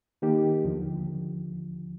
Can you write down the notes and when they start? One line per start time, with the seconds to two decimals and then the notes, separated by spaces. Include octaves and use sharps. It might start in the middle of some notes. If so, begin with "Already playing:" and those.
0.22 D#3 A#3 D#4 G4
0.64 D#2 D3 F3